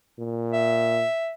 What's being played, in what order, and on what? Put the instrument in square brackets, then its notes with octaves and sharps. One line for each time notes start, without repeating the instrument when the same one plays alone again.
[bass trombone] A#2
[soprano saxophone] E5